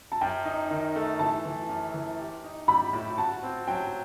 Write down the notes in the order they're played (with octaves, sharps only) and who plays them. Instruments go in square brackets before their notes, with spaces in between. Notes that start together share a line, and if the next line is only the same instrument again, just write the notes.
[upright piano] A5
[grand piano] F#2 [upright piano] G5
[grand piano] D#4
D#3
A3
[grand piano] E3 [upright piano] A5
[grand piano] E3
F#2
E3
G4
D#4
[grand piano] G3 [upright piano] B5
[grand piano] A2
[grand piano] F#4 [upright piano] A5
[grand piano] C4
[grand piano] F#3 [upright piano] G5